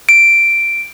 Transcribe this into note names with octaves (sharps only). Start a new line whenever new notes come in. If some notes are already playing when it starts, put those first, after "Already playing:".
D7